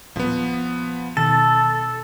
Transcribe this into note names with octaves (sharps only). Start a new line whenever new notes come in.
D#1 F3 B3
B2 D#3 A4 A6